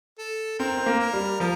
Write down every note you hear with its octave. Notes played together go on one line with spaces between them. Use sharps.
A4
C4 A#4
C4
A#3
A#4
G3
F3 A#4